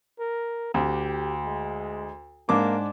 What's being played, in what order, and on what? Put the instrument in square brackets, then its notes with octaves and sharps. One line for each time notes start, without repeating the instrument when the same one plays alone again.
[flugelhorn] A#4
[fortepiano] D2 [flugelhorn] G4
[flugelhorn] G#3
[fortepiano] G#2 D4 D6 [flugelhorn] A#3